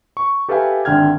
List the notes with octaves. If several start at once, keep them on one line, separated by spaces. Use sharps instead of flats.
C#6
G4 A4 B4 E5 F5 G#5
G#1 D3 G5 F6 G#6